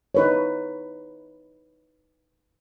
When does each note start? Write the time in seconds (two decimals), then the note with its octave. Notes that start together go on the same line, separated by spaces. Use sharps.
0.15 D#4 B4 C#5